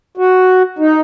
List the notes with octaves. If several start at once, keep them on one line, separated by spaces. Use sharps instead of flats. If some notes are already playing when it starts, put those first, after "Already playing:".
F#4
D#4